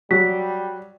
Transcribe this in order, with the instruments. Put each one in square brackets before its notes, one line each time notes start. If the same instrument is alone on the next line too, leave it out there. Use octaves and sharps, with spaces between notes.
[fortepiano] F#3 [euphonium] G3 [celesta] B6